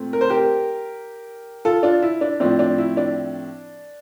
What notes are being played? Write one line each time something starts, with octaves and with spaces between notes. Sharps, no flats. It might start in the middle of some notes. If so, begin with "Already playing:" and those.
Already playing: A#2 A3 C4
A#4
C5
G4 A#4
F4 A4
D4 F4
E4
D4
A2 F3 C4 D4
D4
E4
D4